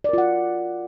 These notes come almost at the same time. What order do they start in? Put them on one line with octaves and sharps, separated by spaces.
D5 A#4 F4 F#5